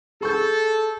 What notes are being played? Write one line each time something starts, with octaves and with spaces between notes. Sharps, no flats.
G#4 A4 C#6 G6